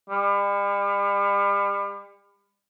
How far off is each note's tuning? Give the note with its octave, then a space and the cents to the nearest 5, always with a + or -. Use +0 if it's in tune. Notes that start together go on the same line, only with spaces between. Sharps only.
G3 +40